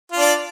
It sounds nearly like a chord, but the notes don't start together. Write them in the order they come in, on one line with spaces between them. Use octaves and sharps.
F4 D4 D5